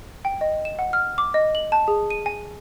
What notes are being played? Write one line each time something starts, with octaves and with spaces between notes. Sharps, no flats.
G5
D#5
E7
F#5
F6
D6
D#5
F#7
A5
G#4
D#7
G#5